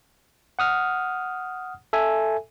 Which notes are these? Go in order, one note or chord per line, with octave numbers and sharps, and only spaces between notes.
F#5 D#6 F6
A4 E5 G#5